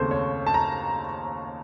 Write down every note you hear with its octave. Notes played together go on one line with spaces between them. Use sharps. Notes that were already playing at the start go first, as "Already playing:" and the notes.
Already playing: D#2 C#3 A3 C4 A4 C5
C#5
A5
A#5